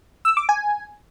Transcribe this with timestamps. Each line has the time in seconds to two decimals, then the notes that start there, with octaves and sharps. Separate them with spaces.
0.25 E6
0.37 D6
0.49 G#5